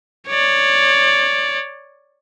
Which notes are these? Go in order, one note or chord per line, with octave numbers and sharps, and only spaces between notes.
C#5 D5